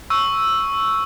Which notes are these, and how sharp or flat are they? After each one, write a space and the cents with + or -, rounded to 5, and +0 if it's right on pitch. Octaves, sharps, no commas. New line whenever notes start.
C#6 +0 E6 +0